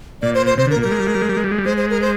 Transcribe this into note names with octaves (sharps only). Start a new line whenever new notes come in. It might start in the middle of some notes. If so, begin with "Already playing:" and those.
A#2 D5
C5
C5
C3 C5
D3
A#4
A#2
G3 A#4
G#3
G3
G#3
G3
G#3
G3
G#3
G3
G#3
G3
G#3 C5
C5
A#4
C5